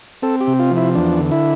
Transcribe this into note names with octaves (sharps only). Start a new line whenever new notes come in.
C4 A4
G4
C3
F4
F3
E4
E2 D4
D3
E4